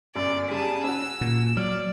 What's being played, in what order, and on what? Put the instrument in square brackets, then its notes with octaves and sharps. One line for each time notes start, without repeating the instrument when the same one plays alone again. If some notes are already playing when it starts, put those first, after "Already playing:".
[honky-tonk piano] G1 F#2 [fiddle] D5
[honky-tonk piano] C#3 G3 B6 [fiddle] G#4 A5
[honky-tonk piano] C#4 F#4 [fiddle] E6
[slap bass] A#2
[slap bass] F#3 [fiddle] D5 [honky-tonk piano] F6